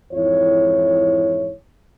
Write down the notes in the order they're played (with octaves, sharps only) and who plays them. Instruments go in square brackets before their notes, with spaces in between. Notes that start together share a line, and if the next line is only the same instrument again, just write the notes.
[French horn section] F2 G#2 E3 E4 C#5